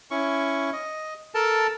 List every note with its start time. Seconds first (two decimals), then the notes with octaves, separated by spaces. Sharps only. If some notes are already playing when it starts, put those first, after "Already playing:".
0.11 C#4 E4 C#6
0.73 D#5
1.34 A4 A#4 A5